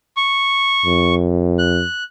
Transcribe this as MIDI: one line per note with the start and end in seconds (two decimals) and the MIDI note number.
0.17 1.15 85
0.85 1.83 41
1.59 2.03 90